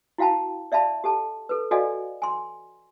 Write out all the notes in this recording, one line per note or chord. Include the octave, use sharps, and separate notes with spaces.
E4 F#4 F5 G5 A5 B5
D5 E5 F5 A5 B5
G4 A4 A5
A4 B4
F#4 A4 D5 D#5 F5 G#5
G#5 C6